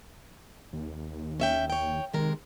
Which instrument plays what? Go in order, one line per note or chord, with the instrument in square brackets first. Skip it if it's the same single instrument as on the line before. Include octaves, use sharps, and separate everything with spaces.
[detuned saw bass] D#2
[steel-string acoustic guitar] C#4 E5 G5
C#5 G5
[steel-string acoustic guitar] C3 G#3 A#4 [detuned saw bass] D#3